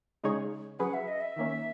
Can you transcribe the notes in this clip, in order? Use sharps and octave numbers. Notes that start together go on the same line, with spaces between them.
C#3 G#3 D#4 G#4 C#5
F#3 C#4 G#4 B4 F#5
E5
D#5
E5
D#3 A#3 C#4